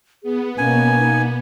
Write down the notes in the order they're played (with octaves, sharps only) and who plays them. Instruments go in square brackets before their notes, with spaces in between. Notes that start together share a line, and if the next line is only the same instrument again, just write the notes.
[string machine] B3 [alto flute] G#4
[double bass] B2 A#3 [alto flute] C#4 [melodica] G#5
[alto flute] D#4